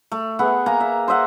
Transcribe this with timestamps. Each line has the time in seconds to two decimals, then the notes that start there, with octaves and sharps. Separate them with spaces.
0.11 A3
0.39 B3 G#4 E5 F#5
0.66 A#3 G#5 A#5
0.80 E5
1.08 C5 D#5 E5 F#5